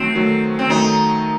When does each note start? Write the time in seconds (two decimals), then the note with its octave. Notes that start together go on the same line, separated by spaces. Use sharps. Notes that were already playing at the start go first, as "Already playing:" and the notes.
Already playing: D#3 F#3 A3 C4
0.14 D#3 F#3 A3
0.59 C4
0.69 D#3 F#3 A3 D#4